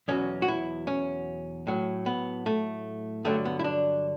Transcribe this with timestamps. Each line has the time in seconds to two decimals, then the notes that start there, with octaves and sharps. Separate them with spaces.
0.08 E2 B2 F#3 C#4
0.42 F#4
0.48 E4
0.87 C#4
1.67 A2 F#3
2.06 B3
2.46 A3
3.25 G2 D3 F#3 A3
3.45 B3
3.59 E4
3.64 D4